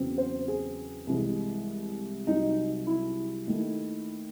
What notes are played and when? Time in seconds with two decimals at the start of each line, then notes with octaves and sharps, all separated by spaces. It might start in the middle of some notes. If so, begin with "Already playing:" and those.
Already playing: E2 C#3 F#3 C4
0.18 C5
0.48 G#4
1.07 C2 C3 E3 G#3
2.27 C2 C3 F#3 D#4
2.87 E4
3.47 D#2 D#3 A3